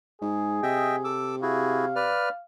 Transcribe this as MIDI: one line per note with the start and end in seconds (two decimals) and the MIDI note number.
0.21 0.61 44
0.21 1.15 68
0.63 2.14 48
0.63 0.96 75
0.63 0.96 76
0.63 0.96 79
1.04 1.36 69
1.04 1.36 86
1.04 1.36 88
1.42 1.85 64
1.42 1.85 66
1.42 1.85 68
1.42 2.44 77
1.96 2.29 71
1.96 2.29 74
1.96 2.29 89